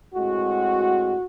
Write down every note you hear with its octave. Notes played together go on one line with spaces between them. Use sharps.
A2 G#3 C4 F#4